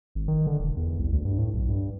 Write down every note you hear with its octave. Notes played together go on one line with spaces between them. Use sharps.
G#1
D#3
D3
E1
E2
C2
D2
G2
A2
B1
G2